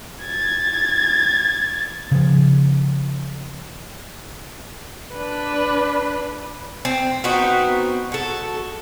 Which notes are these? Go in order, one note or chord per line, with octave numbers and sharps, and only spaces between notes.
G#6 A6
C#3 F3
D4 B4
C4
B3 C4 D#4 F#4
F#4 A4